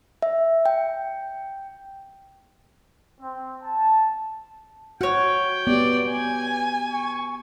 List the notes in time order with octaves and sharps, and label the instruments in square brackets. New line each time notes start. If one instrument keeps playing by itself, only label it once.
[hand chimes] E5
G5
[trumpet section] C4
A5
[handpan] F#4 [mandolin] C#5 F#5 [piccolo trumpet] G5
[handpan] B3 G4 [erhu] D5
[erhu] G#5
[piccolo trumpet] C#6